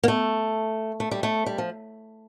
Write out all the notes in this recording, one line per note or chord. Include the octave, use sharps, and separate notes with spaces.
A#3
A3
A3
G3
A3
G3
F3